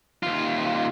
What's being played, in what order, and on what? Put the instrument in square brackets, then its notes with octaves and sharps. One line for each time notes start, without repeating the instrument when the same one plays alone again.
[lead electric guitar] D#2 F4